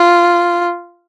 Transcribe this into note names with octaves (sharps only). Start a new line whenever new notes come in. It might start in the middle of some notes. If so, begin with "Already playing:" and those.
Already playing: F4